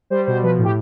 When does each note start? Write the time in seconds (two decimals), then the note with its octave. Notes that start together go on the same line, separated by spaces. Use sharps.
0.10 G3 C5
0.26 B2 C5
0.43 F3 B4
0.58 A2
0.64 G4